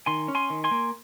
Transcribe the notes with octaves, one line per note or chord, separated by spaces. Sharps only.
D#3 G#5 C6
C#4
G#5 C6
D#3
G#5 C6
A#3